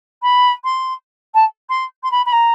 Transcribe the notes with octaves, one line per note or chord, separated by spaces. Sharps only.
B5
C6
A5
C6
C6
B5
B5
A#5